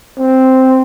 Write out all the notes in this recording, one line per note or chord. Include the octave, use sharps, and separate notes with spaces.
C4